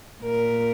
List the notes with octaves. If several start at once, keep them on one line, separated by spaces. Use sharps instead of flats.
A#2 A#4